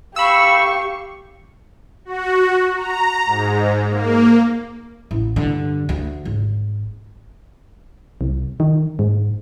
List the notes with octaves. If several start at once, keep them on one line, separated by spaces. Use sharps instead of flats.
G4 F5 B5 C#6 E6
F#4
A#5
G#2
A#3
A1
G2 D3
D2
G#1
C2
D#3
G#2